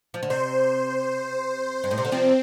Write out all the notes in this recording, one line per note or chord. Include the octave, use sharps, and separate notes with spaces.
F3
D3
C3 C5
G2
A2
C3
D3
C3 F3 C4